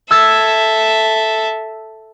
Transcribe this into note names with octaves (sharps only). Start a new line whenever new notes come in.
A4 E5 E6 G#6 A6